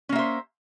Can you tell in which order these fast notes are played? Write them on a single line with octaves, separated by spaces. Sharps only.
C#4 A#3 E5 C5